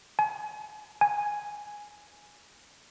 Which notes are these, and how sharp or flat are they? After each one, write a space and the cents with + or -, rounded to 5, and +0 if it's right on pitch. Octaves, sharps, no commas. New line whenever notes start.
G#5 +40
G#5 +0